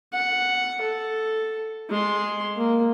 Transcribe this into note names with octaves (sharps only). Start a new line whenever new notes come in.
F#5
A4
G#3 C6
A#3